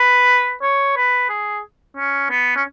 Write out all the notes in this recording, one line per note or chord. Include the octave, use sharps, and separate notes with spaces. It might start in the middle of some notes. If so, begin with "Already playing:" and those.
Already playing: B4
C#5
B4
G#4
C#4
B3
C#4